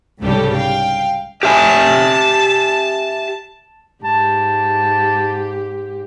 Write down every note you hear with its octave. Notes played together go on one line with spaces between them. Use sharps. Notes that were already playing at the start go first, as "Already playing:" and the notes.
C2 G#2 C#3 G3 G4 A4
F5 G5
G4 E5 G#5 A5
G#2 G4 A5